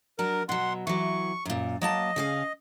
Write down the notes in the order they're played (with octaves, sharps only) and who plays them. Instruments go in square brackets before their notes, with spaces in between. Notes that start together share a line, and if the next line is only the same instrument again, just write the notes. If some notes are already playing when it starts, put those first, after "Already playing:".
[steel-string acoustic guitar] F#3 D4 [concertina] A#4
[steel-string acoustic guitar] B2 F#3 [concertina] F#5 C6
[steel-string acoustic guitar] E3 F#3 [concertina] C#6
[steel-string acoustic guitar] F#2 A#2
[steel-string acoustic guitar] F#3 A#3 A5 [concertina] D#5
[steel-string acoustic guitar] C#3 G#4 F5